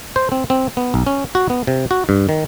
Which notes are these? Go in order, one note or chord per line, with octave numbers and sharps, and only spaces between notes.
C5
C4
C4
B3
B1
C#4
F#4
B3
C3
F#4
G2
D#3